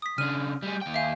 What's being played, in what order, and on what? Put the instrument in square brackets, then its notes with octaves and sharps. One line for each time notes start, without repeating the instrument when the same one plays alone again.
[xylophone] D#6 B6
[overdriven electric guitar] C#3 D4 [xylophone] F6 D#7
[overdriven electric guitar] G3 G#4
D#2 G5
[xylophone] E5 F5 G#5